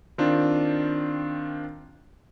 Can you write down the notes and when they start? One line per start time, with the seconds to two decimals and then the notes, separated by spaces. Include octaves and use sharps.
0.18 D#3 C4 D4 F4